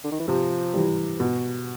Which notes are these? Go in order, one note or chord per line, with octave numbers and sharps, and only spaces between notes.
D3
D#3
E3
C3 F3
E3 G3
B2